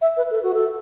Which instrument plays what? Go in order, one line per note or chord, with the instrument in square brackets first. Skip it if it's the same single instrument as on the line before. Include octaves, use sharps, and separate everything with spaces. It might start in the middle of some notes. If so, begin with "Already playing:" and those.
[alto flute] E5
B4
A4
F#4
A4